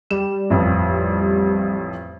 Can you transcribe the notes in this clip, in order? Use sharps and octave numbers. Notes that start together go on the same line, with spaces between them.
G3 E7
A1 F2 F3